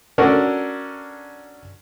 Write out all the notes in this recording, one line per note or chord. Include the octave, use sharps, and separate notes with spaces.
C#4 D4 F#4 A4 A#4